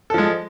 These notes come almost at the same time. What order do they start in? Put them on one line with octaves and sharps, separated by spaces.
A4 F3 G#3